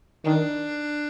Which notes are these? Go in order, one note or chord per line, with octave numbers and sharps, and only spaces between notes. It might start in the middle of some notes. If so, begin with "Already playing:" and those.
D#3 D4